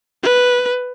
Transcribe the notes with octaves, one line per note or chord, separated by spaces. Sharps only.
B4